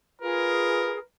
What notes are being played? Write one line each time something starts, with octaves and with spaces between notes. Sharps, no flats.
F4 G#4 A#4 B4